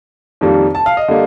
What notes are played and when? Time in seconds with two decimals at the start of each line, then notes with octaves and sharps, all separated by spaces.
0.41 F2 D#3 G3 A#3
0.75 A5
0.86 F5
0.97 D#5
1.08 D3 G3 A#3